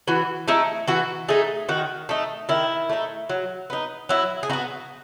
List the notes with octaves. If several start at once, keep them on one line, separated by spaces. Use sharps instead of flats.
E3 F#4
A3 D#4 E4
E3 F#4
A3 D#4 G#4
D#3 F#4
A3 D#4
D#3 E4
A3 D#4
F#3
B3 D#4
F#3 E4
G#4
B3 D#4 F#4